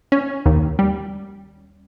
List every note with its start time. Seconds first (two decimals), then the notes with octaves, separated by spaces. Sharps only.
0.12 C#4
0.46 D#2
0.79 G3